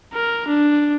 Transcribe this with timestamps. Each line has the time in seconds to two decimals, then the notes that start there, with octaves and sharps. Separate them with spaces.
0.14 A#4
0.48 D4